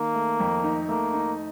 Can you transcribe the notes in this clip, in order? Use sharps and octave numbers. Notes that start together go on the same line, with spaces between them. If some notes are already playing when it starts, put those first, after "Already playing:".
Already playing: D#3 A#3
A3
F2
D#4
A3 A#3
D#4